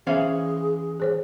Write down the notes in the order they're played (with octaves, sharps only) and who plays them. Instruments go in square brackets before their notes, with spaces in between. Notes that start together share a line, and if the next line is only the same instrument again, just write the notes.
[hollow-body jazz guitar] E3 C#4 F5 [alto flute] G#4 [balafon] C5 E5
[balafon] G#4 C5 C#5